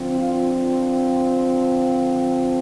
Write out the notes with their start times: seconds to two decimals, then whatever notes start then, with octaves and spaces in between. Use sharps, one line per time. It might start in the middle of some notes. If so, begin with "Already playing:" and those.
Already playing: D3 F3 C4
0.18 F4